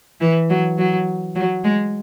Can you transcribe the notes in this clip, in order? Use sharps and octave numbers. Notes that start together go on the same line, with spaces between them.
E3
F#3
F#3
F#3
G#3